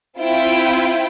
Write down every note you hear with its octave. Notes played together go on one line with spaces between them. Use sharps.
C4 E4 F4 G5